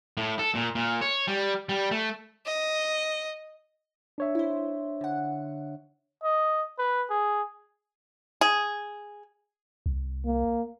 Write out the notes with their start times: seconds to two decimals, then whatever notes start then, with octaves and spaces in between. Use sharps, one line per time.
0.17 A2
0.39 A4
0.55 A#2
0.75 A#2
1.01 C#5
1.28 G3
1.69 G3
1.91 A3
2.46 D#5
4.18 D4 C#5 E5
4.35 E4 C5
5.01 D3 F#5
6.24 D#5
6.79 B4
7.10 G#4
8.41 G#4
9.86 C2
10.26 A#3